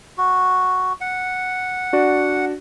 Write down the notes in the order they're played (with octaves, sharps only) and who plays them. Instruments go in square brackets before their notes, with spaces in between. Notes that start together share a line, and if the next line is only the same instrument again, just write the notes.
[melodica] F#4
F#5
[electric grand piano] D4 F#4 D5